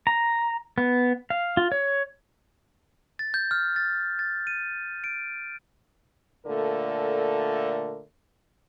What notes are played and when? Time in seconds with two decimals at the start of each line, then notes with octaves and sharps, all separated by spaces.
0.07 A#5
0.78 B3
1.30 F5
1.57 F4
1.72 C#5
3.19 A6
3.34 G6
3.51 F6
3.76 A6
4.19 A6
4.47 D#7
5.04 D7
6.46 A#2 D3 A3 A#4